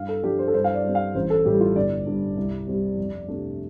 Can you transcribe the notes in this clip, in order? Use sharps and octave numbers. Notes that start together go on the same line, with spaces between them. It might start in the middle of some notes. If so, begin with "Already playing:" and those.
Already playing: G2 F5
A4
F3 D4 G4
C5
A4
G2 C5
F5
D5
G3 C4
F5
A1 C5
A4
A2 G3 G4
F4
G1 D5
G2 G3
C2
C3 G3 C4
F2
C3 A3 D4